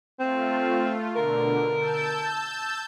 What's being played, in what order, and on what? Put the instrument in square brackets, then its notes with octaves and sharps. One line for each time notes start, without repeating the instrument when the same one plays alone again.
[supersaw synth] A3 F4 [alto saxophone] C4
[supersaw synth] B2 D3 [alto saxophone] A#4
[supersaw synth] A5 E6 G6